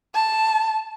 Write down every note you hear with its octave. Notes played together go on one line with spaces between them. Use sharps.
A5